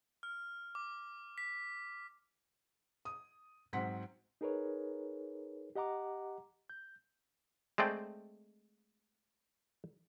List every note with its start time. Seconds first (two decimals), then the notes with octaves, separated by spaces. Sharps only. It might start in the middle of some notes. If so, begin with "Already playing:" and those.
0.23 F6
0.75 D6
1.38 B6
3.05 D#6
3.73 G#2 F#3 C4 F#5 B6
4.41 D#4 G#4 A#4 B4 C#5
5.75 G4 D#5 F#5 A#5 D6
6.70 G6
7.78 G#3 A3 C4 D5 G5